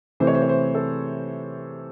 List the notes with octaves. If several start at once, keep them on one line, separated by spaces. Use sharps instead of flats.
C3 E3 A3 C5
C#5
C5
C#5
C5
A4